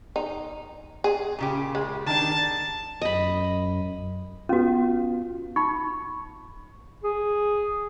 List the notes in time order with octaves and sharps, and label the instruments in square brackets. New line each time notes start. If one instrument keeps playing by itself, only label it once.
[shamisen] D#4
G#4
[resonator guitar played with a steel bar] A#2 C#3 G4
[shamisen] G#3
[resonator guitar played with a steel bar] D#3 D4 [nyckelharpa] A5
[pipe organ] F#2 [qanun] D#5 B5
[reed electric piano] B3 F4 [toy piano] C#4 F#4
[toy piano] D#4 B5 [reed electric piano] C#6
[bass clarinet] G#4